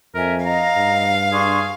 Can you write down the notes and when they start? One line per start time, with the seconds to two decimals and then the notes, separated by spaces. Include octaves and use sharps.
0.15 F2 A#4 E5 G#5
0.46 D#5 F5 A#5
0.77 G2
1.32 D4 G#4 C6 C#6